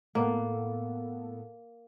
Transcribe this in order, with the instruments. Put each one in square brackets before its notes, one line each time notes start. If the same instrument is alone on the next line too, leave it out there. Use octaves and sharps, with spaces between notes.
[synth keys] A2 B3 A4 [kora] A#3